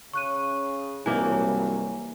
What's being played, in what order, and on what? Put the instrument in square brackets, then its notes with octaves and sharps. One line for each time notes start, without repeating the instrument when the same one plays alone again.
[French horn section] C#3 [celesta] C#6 F#6 D#7
[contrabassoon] C2 [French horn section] G2 F#3 [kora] E3 A#3 D#4 [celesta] G#5